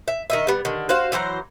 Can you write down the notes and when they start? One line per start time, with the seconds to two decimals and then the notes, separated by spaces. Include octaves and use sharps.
0.08 E5
0.30 D#3 D#5 E5
0.47 G3 B3
0.65 D3 D#3
0.89 F#4 C5 F5
1.12 E3 F#3 C5 A#5